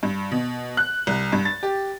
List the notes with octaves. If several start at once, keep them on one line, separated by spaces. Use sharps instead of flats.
G2
B2
F#6
C2
G2
A6
G4